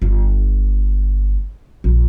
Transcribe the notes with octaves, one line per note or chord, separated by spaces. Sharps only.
G1
A#1